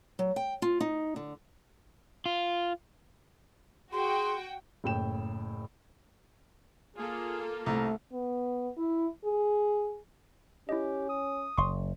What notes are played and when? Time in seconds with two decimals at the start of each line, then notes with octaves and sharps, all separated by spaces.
0.19 F#3
0.36 G5
0.62 F4
0.80 D#4
1.16 D3
2.26 F4
3.93 F#4 G#4 G5 C6
4.84 F#1 A2 G5 E7
6.97 A#3 F4 G#4 A4
7.66 C2 A3 A#5
8.13 B3
8.78 E4
9.25 G#4
10.69 C#4 E4 G4 D#5
11.09 D#6
11.58 F#1 C6 C#6